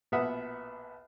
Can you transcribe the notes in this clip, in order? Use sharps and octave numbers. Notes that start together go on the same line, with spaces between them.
A#1 B2 B3 E5 F#5 D#6